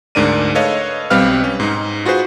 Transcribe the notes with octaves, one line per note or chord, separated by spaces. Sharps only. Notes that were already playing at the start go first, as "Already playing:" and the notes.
D2 G#2 D4 A#4 D5 D#7
A4 B4 C#5 D#5 F5
B1 G3 C4 B4 F5 F6
C#4
G#2 D#4
F4 F#4 G#4 B4 C5